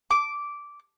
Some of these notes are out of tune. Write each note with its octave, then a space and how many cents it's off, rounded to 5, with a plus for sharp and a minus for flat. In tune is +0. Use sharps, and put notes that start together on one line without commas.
D6 -10